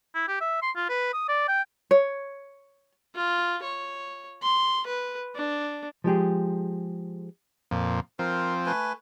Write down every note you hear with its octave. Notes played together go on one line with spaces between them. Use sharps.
E4
G4
E5
C6
F4
B4
D#6
D5
G5
C#5
F4
C#5
C6
B4
D4
F3 G#3 G4 G#4
F2 A#2
F3 C4 A#4
A3 B4 G#5